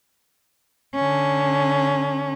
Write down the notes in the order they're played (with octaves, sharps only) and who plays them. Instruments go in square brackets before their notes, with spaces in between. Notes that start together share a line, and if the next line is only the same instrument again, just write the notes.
[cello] D3 C#4